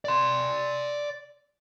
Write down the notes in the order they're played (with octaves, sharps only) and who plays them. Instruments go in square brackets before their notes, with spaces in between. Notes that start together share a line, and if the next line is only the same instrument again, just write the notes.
[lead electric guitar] D5 C6